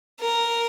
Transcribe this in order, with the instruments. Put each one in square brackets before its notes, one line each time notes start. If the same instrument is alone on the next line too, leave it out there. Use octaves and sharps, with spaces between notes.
[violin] A#4